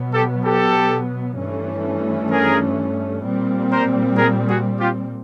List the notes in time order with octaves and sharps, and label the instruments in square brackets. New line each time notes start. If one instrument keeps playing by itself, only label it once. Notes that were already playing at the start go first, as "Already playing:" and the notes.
Already playing: [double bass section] B2 F#3 B3
[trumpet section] G4 A4
G4 A4
[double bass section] G2 E3 A3 C#4
[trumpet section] G#4 A#4
[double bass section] A#2 G3 C4
[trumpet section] A#4 C5
G#4 A#4
F#4 G#4
F4 G4